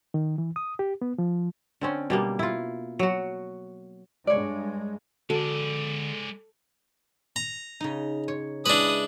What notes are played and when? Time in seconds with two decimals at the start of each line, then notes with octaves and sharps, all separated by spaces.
0.14 D#3
0.38 E3
0.56 D#6
0.79 G4
1.02 B3
1.18 F3
1.81 D3 C4 C#4
2.10 B2 G3 A#3
2.39 E4 F4
2.99 F#3 F#4
4.27 G2 G#3 C#5 D5
5.30 D3 G#3 F#4 A4 D5
7.36 A#5
7.80 C#3 D#4
8.28 C#5
8.66 G#3 D4 E4 B4 D#6